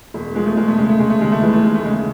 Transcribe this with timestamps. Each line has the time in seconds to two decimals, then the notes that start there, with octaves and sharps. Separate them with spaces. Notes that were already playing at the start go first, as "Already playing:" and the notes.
0.14 E1
0.35 F3 G#3
0.46 A3
0.57 E1 G#3
0.68 A3
0.78 C#3 G#3
0.89 A3
0.99 C#3 G#3
1.10 A3
1.20 D#2 G#3
1.32 A3
1.42 E3 G#3
1.53 A3
1.64 D#2 G#3
1.75 A3
1.85 C#3 G#3